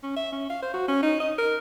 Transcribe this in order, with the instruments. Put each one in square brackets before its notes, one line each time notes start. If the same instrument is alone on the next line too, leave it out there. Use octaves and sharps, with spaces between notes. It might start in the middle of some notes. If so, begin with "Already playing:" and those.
[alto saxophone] C#4
E5
C#4
F5
C5
F#4
C#4
D#4
D#5
A#4